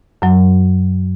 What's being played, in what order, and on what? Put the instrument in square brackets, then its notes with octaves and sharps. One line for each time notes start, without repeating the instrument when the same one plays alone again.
[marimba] F#2 F#3